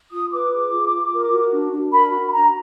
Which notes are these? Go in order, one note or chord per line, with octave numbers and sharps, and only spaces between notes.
F4 D#6
B4 D6
G#4
F4
F4
A#4
F#4
D4
D4
A#4 B5
F#4
B5
D4 A#5